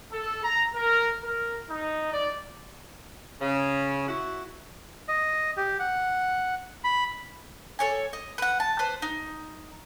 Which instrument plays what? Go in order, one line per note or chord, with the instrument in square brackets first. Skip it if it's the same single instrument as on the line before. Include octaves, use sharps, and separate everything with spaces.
[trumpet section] A4
A#5
A#4
A#4
D#4
D5
[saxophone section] C#3
E4 F#4
[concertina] D#5
G4
F#5
B5
[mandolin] A4 C#5 G#5
D#5
B4 F#5
A5
B4 C5
D#4